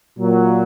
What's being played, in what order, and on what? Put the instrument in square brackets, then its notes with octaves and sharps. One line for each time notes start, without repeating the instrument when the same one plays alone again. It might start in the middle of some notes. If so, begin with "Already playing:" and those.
[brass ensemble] A#2 F#3